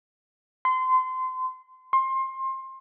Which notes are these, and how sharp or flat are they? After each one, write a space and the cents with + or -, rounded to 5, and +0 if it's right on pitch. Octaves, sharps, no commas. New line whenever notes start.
C6 -25
C6 +25